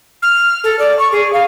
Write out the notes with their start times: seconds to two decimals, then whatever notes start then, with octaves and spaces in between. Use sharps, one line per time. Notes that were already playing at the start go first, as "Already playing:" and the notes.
0.22 F6
0.64 A4
0.79 D5
0.99 C#6
1.12 G#4
1.33 F5